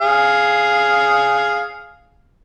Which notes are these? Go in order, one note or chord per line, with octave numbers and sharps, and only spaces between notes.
G#4 F5